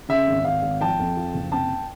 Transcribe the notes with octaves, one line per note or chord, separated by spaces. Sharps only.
C#3 E5
G#1
G#1 F5
G#1
F3 G5 A5
F2
F3
F#1
C3 G5 A5